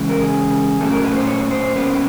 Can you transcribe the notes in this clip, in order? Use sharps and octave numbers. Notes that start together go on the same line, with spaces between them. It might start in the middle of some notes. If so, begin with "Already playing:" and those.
Already playing: C#3 E3 G#3 C#4
A#4
G#4
A#2 F#3 A3 C#4 A4
A#4
B4
C5
C#5
C5
B2 G3 A#3 C#4 B4